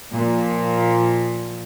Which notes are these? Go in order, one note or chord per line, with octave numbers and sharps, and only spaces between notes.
A#2 F3